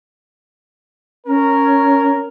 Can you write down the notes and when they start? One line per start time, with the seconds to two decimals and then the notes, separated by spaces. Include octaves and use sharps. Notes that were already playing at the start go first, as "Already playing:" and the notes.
1.27 C#4 A#4